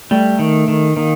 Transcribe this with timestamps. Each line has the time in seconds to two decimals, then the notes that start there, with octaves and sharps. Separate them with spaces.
0.11 G3 A3
0.39 D#3
0.68 D#3
0.97 D#3 A#3